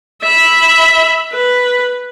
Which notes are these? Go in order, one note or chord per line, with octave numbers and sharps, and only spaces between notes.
E5 B5
B4